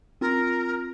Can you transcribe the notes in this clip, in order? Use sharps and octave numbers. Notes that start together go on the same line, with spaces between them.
C4 F4 A#4